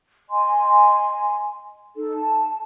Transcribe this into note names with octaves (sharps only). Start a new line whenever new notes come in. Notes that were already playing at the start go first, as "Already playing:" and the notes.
D#5 G#5 C6
D#4 A4
A5